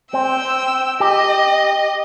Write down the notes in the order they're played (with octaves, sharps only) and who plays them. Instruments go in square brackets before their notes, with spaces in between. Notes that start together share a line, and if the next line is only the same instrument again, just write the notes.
[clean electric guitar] C4 [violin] G5 E6
[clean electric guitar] G4 [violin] D#5